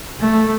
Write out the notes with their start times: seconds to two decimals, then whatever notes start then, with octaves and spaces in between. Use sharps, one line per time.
0.20 A3